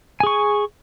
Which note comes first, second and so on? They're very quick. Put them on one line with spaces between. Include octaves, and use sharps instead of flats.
G#5 G#4 C#6